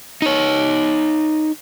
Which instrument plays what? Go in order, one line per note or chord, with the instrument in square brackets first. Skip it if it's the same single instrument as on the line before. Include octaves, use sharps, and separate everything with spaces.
[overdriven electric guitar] D#4 C#5